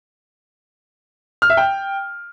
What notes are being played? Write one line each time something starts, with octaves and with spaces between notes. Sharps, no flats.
F6
E5
G5